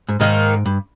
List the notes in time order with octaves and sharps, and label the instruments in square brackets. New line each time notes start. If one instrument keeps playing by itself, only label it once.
[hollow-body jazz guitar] G#2
[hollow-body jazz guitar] G#2 [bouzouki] D#3 A#3 D#4
[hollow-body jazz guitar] G2